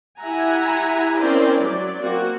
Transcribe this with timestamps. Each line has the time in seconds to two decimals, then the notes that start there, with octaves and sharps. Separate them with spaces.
0.20 E4 G4 E5 F#5 G#5 A#5
1.16 C4 C#4 E4 A#4 C5 D5
1.60 F#3 D5
2.01 A#3 C4 F#4